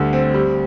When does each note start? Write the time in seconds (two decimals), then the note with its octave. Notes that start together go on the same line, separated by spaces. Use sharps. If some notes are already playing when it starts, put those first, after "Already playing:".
Already playing: D2 D3 G3
0.13 C4
0.34 G3